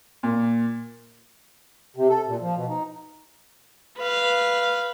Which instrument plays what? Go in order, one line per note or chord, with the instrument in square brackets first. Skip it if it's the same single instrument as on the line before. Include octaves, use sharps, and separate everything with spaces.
[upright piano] A#2
[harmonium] C3
A4
A#2
F3
B2
D#4
[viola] B4 F5